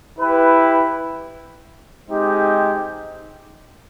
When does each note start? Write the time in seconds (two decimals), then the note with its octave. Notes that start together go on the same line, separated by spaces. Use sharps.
0.18 E4 G4 B4
2.08 G#3 C4 D#4 G4